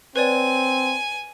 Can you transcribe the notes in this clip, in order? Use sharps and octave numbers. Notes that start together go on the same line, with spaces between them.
C4 B4 C#5 D5 G#5